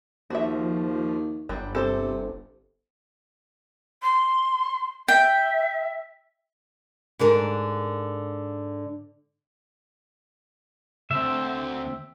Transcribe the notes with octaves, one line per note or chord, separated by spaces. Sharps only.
D#2 F3 F#4 E5
G1 F#3 G3
C3 A4 C5
C6
E5 G5
G#2 D3 A#4
D2 C4 E5